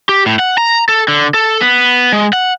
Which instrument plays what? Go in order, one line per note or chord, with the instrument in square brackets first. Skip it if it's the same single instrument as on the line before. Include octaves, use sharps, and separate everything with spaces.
[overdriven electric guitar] G4
A2
F#5
A#5
A4
D3
A4
B3
G#3
F#5